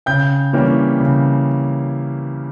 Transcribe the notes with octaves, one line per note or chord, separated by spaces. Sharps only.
C#3 G5 G6
E3 G3 A#3 C#4
C#3